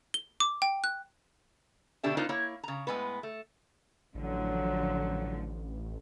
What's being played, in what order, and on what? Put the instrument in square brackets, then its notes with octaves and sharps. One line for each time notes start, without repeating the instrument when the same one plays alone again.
[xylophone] G7
D6
G5
F#6
[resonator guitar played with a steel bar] B2 D3 D4 G4 E5
B3 D4 D#4 F4 A#4 C5
A#3 E4 C#5
C#3 A#5
A2 F#3 G#3 B3 B4
A3
[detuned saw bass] A1 [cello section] D3 F3 [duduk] F#3